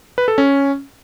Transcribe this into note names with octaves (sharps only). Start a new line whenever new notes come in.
B4
A4
C#4